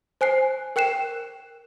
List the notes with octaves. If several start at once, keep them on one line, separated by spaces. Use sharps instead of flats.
C5 G#5 F#6 C7
A#4 G5 F#6 C7 E7